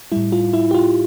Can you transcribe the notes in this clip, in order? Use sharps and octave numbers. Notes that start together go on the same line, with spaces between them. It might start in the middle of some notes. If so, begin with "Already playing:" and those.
A2 G3 E4
F4
E4
G4
F4